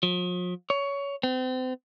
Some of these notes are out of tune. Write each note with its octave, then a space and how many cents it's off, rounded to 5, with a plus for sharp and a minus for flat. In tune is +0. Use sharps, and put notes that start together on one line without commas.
F3 +45
C#5 +20
C4 -35